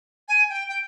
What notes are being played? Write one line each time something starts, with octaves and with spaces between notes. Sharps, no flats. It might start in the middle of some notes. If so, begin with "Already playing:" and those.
G#5
G5
G5